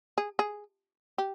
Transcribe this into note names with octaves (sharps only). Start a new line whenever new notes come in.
G#4
G#4
G4